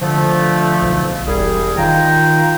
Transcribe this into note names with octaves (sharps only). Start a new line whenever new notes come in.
D3 F3 A3
B1
E1 C2 G3 G#4
D#3 F4 G5 A#5